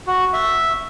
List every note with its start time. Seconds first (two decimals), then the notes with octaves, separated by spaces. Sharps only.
0.07 F#4
0.33 E5